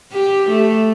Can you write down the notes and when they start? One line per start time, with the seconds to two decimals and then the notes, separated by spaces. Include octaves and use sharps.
0.12 G4
0.50 A3